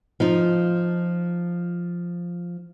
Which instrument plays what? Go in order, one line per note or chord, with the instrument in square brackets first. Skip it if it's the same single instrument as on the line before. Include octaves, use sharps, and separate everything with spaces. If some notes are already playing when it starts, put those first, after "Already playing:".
[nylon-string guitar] F3 D#4 F4